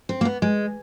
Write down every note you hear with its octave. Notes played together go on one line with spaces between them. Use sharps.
C4
A#3
B3
G#3